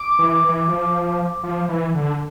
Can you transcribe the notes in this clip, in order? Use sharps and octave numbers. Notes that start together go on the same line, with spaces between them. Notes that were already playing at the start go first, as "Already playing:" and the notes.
Already playing: D6
E3
E3
F3
F3
E3
D3